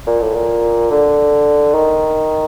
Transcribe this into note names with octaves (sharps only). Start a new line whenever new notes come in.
A#2
A2
A#2
D3
D#3